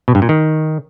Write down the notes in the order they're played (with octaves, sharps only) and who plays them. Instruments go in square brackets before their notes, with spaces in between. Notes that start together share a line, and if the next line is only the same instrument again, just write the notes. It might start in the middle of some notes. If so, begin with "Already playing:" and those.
[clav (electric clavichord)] B2
G2
A#2
D#3